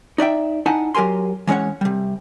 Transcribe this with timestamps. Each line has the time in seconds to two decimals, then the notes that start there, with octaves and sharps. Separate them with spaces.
0.18 D#4 D5 E5 G5
0.66 D#4 E4 F#5 G#5 A5
0.95 F#3 G4 A#4 G#5 C6
1.47 E3 G#3 C#4 C#5 F#5
1.81 C3 G3